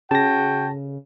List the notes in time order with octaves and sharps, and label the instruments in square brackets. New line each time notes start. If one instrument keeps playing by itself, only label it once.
[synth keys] C#3 [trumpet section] F#4 G5 [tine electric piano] A5 A#6